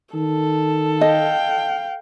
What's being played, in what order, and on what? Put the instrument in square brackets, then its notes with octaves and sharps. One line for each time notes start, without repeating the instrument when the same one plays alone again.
[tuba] D#3 [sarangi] A4
[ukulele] D#5 [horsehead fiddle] F5 G5